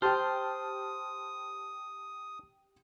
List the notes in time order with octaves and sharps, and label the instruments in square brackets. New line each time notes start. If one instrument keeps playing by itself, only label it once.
[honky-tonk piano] G4 G5 [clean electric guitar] C5 [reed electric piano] A5 F6 [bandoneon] D#6